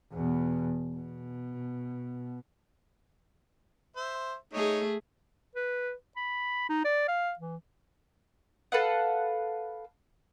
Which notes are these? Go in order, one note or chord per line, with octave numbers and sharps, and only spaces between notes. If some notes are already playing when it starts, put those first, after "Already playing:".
E2 B2
B2
C5 E5
A3 D#4 G#4 C#5
B4
B5
D#4
D5
F5
E3
A4 B4 F5 F#5